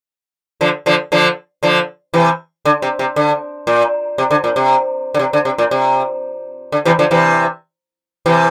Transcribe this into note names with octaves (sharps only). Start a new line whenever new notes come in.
D3 F3
D3 F3
D3 F3
D3 F3
C3 E3
D3
C3
C3
D3
A#2
C3
D3
A#2
C3
D3
C3
D3
C3
A#2
C3
D3
C3 E3
D3 F3
C3 E3
C3 E3